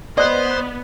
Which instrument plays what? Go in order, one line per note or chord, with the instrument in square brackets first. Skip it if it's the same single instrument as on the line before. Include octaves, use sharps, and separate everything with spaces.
[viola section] B3 [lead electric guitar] C5 [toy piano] D5 [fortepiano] D#5 F#6